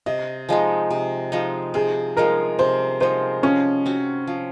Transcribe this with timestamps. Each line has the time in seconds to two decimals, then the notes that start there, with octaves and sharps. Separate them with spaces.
0.06 C3 D#5
0.49 F3 G#3 D#4
0.90 C3
1.32 F3 G#3 D#4
1.74 C3 G#4
2.17 F3 G#3 D#4 A#4
2.59 C3 C5
3.00 F3 G#3 D#4 C5
3.43 F3 C#4
3.86 C4 F#4
4.27 F3